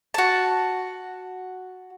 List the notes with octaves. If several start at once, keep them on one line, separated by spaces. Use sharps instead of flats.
F#4 A5